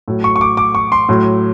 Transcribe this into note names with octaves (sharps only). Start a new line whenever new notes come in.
A2 F#3
C#6
C#6
D6
D6
C#6
C6
A2 F#3